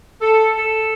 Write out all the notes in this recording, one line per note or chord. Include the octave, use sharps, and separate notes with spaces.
A4
A4